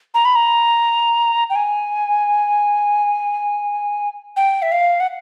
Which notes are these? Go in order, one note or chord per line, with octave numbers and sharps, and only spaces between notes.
A#5
B5
A#5
G5
G#5
G5
E5
F5
F#5